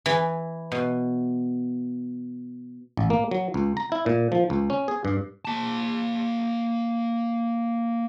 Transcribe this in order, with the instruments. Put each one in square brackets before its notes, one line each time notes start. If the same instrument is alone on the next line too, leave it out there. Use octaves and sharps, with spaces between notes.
[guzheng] E3
B2
[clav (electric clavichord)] A1
A#3
F#3
C#2
A#5
E4
A#2
F3
C#2
C#4
G#4
G2
[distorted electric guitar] A#3 A5